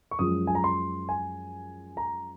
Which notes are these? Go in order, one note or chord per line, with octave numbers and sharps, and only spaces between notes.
C#6
F#2 F3 G#3 D#6
G#5
A#5
C6
G#5
A#5